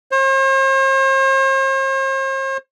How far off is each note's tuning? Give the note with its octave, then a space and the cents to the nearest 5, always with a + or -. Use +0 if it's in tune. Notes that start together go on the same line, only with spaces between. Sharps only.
C5 +45